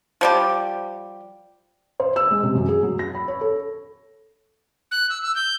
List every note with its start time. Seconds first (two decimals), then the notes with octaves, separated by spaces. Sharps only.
0.21 F3 G3 G4
2.00 C5
2.16 E6
2.31 G#3
2.43 C3
2.55 F#2
2.69 G#4
2.83 F#3
2.99 A#6
3.15 B5
3.28 C#5
3.41 A4
4.91 F#6
5.10 E6
5.23 E6
5.35 G6